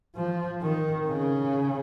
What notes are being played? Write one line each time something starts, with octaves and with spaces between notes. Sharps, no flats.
F3
D#3
C#3